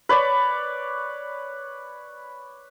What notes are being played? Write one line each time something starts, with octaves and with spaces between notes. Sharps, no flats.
B4 C#5 D5